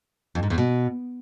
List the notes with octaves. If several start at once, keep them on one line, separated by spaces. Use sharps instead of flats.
F2
G#2
E2
B2